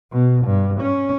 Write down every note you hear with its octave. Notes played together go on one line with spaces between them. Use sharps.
B2
G2
C#4